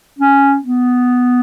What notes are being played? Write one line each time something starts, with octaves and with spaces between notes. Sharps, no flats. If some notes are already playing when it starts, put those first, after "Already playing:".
C#4
B3